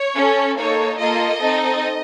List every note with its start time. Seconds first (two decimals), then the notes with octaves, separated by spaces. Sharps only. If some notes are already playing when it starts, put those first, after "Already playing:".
Already playing: C#5
0.15 C#4 A4
0.57 A#3 D#4 A4 C#5
0.99 A#3 F4 A4 D#5
1.41 C4 D#4 A4